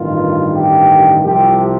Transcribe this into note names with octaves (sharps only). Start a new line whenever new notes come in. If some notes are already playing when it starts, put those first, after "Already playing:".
Already playing: A1 G2 D#3 F4
G4
C2 C3 F3 G4